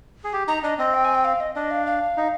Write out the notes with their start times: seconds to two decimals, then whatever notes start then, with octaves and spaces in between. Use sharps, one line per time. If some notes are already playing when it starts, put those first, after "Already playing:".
0.24 G#4
0.33 G4
0.48 D#4 A#5
0.63 D4 D#5
0.79 C4 D#5
0.94 G5
1.05 G#5
1.15 G5
1.25 F5
1.40 D#5
1.55 D4 D#5
1.71 F5
1.87 F5
2.17 D#4